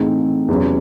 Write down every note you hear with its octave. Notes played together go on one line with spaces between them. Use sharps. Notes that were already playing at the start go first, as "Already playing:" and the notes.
Already playing: A2 E3 C4 D#4 G#4
E2 C3 F#3 C#4